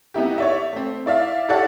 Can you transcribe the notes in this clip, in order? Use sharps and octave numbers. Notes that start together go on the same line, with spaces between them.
B3 D#4 E4 G4
C#5 D5 E5
A3 C4
E4 D5 E5 F5
E4 G4 A4 C#5 D5 F#5